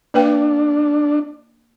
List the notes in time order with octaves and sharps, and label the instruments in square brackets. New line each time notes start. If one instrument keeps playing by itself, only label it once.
[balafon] A#3 B4 G5 [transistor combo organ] D4